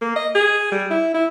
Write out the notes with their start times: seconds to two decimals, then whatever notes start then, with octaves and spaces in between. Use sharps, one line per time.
0.01 A#3
0.16 D#5
0.35 G#4
0.72 G3
0.90 E4
1.14 E4